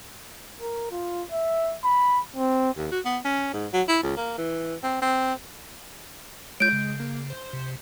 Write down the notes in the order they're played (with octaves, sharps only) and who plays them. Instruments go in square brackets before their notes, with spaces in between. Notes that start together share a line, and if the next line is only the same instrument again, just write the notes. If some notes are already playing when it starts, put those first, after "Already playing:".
[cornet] A#4
F4
E5
B5
C4
[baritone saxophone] D#2
F#4
B3
C#4
G#2
F#3
E4
C#2
A#3
E3
C4
C4
[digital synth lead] G#3 [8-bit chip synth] F4 C#5 [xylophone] G6 D7
[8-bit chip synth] C#3
[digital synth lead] A#3
C5
[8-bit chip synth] C3